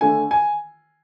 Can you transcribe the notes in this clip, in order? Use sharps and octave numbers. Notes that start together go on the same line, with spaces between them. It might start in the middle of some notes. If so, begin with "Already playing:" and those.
D3 A3 G#5
G#5